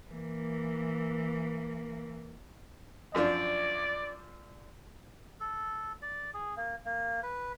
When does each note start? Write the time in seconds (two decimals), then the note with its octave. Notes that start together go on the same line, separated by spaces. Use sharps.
0.11 E3 A#3
3.15 F#2 F3 D4 D5
5.40 A4
6.02 D5
6.34 G#4
6.57 A#3
6.86 A#3
7.23 B4